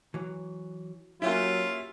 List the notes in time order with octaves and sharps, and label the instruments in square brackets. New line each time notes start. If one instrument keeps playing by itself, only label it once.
[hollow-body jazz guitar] E3 F#3
[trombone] F#3 [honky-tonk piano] A#3 C#4 E5 [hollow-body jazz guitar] E4 G4 F#5 [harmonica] F4